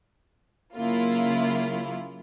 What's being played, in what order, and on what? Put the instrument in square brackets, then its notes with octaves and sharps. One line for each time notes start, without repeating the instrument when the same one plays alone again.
[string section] C#3 F#3 A#3 E4 F4